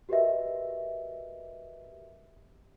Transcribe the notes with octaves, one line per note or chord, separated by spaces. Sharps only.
F#4 G4 A#4 B4 D#5 E5